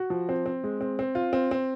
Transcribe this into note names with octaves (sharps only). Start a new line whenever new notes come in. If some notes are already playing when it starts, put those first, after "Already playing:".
Already playing: F#4
F3
C4
C4
G#3
C4
C4
F4
C4
C4